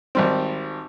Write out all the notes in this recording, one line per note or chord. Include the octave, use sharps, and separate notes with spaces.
G#1 G3 C4